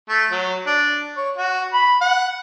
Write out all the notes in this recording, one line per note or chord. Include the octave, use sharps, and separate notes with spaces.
A3
F#3
D4
C#5
F#4
B5
F#5